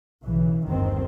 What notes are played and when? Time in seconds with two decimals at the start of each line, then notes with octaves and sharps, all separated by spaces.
0.25 B1 C#3 E3
0.67 G1 D#2 G#2 D#3 C4